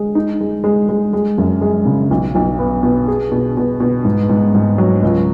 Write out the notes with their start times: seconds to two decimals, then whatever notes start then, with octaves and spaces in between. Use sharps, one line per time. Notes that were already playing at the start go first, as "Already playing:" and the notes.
Already playing: G#3
0.15 D#4
0.41 G#3
0.64 G#3
0.89 G#3
1.13 G#3
1.38 F#2
1.61 G#3
1.85 C#3
2.11 B1
2.35 B1
2.59 B3
2.83 B2
3.08 G#4
3.32 B2
3.57 B2
3.80 B2
4.05 G#2
4.29 G#2
4.54 G#2
4.78 F#3
5.03 C#2